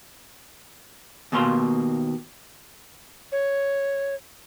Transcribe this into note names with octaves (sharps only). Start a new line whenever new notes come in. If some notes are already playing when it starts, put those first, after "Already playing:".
D#2 B2 A#3 A#4 F5 C6
C#5